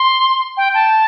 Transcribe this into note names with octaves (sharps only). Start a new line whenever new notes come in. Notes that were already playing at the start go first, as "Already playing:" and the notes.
Already playing: C6
G5
A5